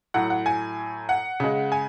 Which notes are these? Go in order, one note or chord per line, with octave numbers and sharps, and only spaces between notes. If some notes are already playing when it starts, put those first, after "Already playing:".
A2 F#3 F#5
F#5
G#5
F#5
C#3 G#3
G#5